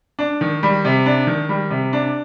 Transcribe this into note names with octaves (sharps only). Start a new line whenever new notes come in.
D4
D#3
G3
C3
D4
D#3
G3
C3
D4